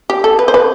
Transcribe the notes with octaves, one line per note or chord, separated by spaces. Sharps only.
G4
A4
B4
C5
B4